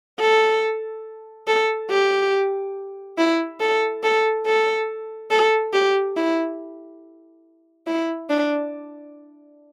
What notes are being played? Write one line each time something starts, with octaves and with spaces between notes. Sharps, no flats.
A4
A4
G4
E4
A4
A4
A4
A4
G4
E4
E4
D4